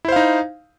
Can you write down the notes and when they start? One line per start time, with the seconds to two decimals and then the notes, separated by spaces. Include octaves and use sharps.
0.05 E4
0.08 C5
0.12 F5
0.16 D#4